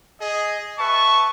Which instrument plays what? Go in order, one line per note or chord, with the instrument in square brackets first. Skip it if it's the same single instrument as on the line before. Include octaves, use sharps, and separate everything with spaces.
[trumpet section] G#4 D#5
[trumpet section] B4 E5 A5 [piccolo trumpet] C#6